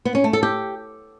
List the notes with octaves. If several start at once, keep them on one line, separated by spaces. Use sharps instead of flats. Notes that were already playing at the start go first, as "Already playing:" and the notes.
B3
C#4
A3
A4
G4